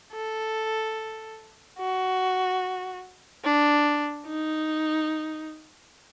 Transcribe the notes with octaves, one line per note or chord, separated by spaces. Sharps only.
A4
F#4
D4
D#4